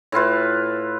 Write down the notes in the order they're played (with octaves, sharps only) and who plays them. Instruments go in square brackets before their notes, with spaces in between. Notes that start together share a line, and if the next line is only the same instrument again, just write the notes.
[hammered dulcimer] A2 E4 F4 B4